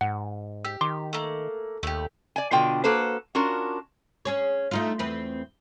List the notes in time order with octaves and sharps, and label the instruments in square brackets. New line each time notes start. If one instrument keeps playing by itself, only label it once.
[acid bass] G#2 [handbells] F#5
[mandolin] G4 [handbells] E6
[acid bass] D#3 [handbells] C6 D6
[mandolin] A3 A#3
[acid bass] D#2 [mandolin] A3 G4
[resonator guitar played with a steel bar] D5 G#5
B2 D3 F4 G5
A#3 F#4 A4 B4 C5
C#4 D4 F4 F#4 A#4
[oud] C#4 G#4 C#5
A3 D#4 F4
E2 C4 B4